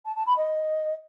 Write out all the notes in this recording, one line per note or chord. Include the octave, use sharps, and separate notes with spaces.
A5
A5
B5
D#5